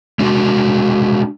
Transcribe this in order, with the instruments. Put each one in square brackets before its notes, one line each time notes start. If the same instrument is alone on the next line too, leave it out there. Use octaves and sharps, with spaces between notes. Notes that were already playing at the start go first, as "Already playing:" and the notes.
[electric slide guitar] G#3 D4 F#4